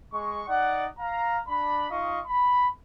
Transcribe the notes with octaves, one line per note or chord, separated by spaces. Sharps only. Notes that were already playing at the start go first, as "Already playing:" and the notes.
G#3 C#6
D#4 D5 F#5
F5 A#5
D4 B5
D#4 F4 D#5 F5 C#6
B5